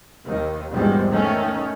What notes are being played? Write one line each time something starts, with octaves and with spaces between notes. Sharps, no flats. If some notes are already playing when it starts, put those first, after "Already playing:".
D#2 D#3
A#1 E2 G#2 D#3 G3
D#3 A3 C#4